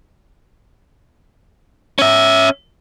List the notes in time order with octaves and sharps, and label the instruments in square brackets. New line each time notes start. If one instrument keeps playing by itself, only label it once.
[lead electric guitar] C#4 E5